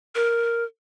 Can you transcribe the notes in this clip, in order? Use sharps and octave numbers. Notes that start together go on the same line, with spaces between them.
A#4